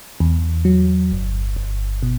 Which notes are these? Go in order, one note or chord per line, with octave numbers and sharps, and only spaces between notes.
E2
F#3
G1
G1
B2